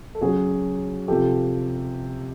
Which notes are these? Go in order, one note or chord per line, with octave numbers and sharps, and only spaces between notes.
A4
C#3 F#3 F#4 G#4
C3 F3 G4 A4